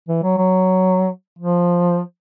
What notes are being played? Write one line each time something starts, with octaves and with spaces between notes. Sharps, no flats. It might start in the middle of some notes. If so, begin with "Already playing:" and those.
E3
F#3
F#3
F3